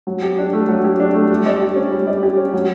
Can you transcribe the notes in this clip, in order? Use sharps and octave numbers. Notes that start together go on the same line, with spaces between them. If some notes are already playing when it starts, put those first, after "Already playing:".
F#3
G4
D4
A3
F#3
G4
D4
A3
G3
D5
G4
C#4
G3
D5
G4
C#4
F#3